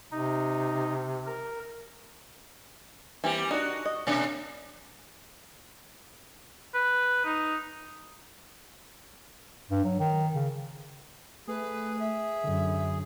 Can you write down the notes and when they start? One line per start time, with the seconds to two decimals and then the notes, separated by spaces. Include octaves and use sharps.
0.12 C3 D#4
1.27 A#4
3.24 E3 G3 A#3 C4 G4
3.51 D4 D#4 F#4
3.85 D#5
4.07 B2 A#3 C#4 D4 D5
6.74 B4
7.25 D#4
9.71 G2
9.84 F#3
9.99 D#3
10.34 C#3
11.48 A3 G#4 B4
11.99 E5
12.44 F#2 D3